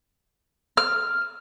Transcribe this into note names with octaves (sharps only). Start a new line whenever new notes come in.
F6